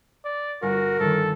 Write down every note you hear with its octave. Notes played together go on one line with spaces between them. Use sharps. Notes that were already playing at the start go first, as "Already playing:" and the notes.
D5
G1 F#4 A#4 G#5 C#7
G1 D#3 A4